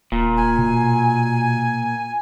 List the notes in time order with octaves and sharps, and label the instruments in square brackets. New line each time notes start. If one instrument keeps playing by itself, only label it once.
[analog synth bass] D#1 [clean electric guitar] A#2
[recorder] G#5
[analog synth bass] B2